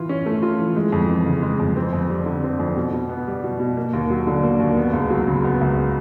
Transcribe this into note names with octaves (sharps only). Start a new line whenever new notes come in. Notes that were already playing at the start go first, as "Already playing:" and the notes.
Already playing: E3 F4
C#4
A3
F4
E3
G#3
F2
E3
C#3
G#3
F2
C4
F2
G3
D3
C4
F2
B2
B2
B3
G3
B2
B2
A#3
D#2
F#3
D3
A#3
D#2
B3
C#2
F#3
C#3
B3
C#2